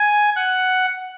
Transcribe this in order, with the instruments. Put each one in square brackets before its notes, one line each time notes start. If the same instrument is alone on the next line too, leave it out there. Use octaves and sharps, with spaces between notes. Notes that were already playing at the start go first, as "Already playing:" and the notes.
Already playing: [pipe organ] G#5
F#5